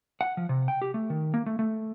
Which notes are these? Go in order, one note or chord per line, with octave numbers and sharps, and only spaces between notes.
F#5
F3
C3
G5
G4
A3
D#3
A#3
A3
A3